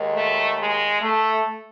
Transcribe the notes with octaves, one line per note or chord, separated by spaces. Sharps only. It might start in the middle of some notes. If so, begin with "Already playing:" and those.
Already playing: D#2 D#3 G#3
A3
G#3
A3